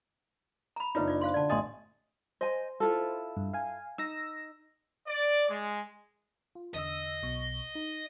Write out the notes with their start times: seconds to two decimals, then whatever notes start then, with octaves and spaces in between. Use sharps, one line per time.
0.76 A#5 B5
0.95 F#1 D4 D#4 F4 B4
1.08 F4 D5
1.21 C5 F5 C6
1.34 D3 D5 A5
1.50 A1 D#5 G#5 C6 D#6
2.41 C5 D#5 G#5
2.80 E4 F4 A4
3.37 G2
3.54 F5 G#5
3.98 D#4 E6 A#6
5.07 D5
5.49 G#3
6.55 F4
6.74 E2 D3 D#5 E6
7.23 B1 B2 C#6
7.75 D#4